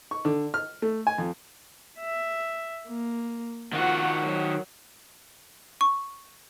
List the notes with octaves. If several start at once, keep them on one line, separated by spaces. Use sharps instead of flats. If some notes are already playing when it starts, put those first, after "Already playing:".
C#6
D3
F6
A3
G#5
F2
E5
A#3
D#3 F4 F#4 F#5
F#3
C#6